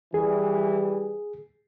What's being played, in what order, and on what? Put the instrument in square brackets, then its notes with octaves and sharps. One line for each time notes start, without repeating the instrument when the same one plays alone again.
[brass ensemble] E3 G3 [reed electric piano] G#4